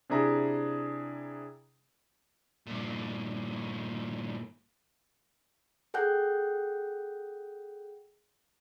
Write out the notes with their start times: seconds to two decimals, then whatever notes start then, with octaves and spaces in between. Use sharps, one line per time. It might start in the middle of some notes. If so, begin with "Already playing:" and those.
0.09 C3 D4 E4 G#4 A#5
2.66 G2 A#2
5.94 G#4 A4 F#5 G5 F#6 G6